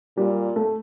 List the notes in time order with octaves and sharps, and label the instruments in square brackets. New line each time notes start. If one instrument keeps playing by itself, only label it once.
[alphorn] A#2 [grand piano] G3
[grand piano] A3